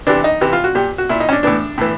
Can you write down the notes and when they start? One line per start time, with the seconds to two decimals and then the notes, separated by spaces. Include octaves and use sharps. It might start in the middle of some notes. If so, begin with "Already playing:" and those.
0.07 C3 E3 D4
0.24 D#4
0.41 C3 E3
0.53 F4
0.64 F#4
0.75 A#2 G4
0.98 F#4
1.09 A#2 E4
1.20 D#4
1.29 C#4
1.32 D4
1.43 A2 E3 D4
1.78 A2 E3